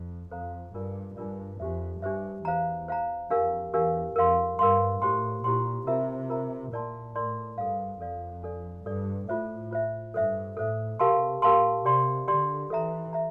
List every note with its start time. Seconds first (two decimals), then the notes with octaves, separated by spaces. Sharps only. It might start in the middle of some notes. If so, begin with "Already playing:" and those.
Already playing: F2
0.31 F2 A4 C5 F5 A#5
0.74 G2 D4 F4 A#4 D5
1.16 G2 D4 F4 A#4 D5
1.60 F2 D4 G4 C5 E5
2.02 G2 D4 G4 C5 E5
2.45 E2 C5 F5 A#5
2.88 C5 F5 A#5
3.30 F2 D4 G4 A#4 F5
3.73 E2 D4 G4 A#4 F5
4.16 F2 A#4 F5 C6
4.59 G2 A#4 F5 C6
5.02 A2 E4 G4 C5 G5 C6
5.44 A#2 E4 G4 C5 G5 C6
5.87 C3 F4 A#4 E5 A#5
6.30 F4 A#4 E5 A#5
6.72 A#2 E4 A#4 D5 A5 C6
7.15 A2 E4 A#4 D5 A5 C6
7.58 G2 A4 D5 F5
8.00 F2 A4 D5 F5
8.43 D4 A4 D5
8.86 G2 D4 A4 D5
9.29 A2 F4 C5 E5
9.71 F4 C5 E5
10.14 G2 A4 C5 E5
10.57 A2 A4 C5 E5
10.99 C3 G4 A#4 F5 A5 C6
11.42 A#2 G4 A#4 F5 A5 C6
11.85 C3 G4 D5 G5 C6
12.28 D3 G4 D5 G5 C6
12.70 E3 A4 E5 A#5
13.13 E5 A#5